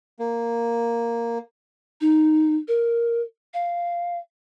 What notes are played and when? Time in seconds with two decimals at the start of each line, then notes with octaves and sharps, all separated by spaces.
0.19 A#3
2.01 D#4
2.68 A#4
3.54 F5